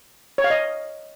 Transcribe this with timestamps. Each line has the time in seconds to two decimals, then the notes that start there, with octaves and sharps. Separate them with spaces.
0.38 C#5
0.44 F5
0.50 D#5